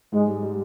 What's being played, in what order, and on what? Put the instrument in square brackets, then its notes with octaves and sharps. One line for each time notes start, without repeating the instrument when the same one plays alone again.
[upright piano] G#2 [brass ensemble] G#3
[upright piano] G3
G3